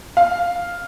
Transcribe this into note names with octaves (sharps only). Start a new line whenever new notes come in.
F5